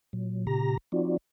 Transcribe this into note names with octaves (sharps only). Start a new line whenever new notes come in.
A#2 F#3
A#2 C#3 G4 A#5 A#6
F3 C4 D#4 F4 F#4 D5